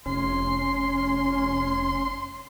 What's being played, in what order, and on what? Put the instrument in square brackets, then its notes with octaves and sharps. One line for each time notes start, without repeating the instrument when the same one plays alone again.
[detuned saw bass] F1 [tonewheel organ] C#4 [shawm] C6